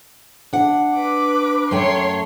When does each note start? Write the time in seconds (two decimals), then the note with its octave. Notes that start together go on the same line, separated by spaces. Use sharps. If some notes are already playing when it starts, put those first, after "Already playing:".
0.53 D4 F#5
0.94 B4 D6
1.71 F#2 A3 C#5 G5 C6